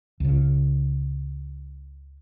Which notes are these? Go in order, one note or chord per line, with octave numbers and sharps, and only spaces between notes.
C#2 C#3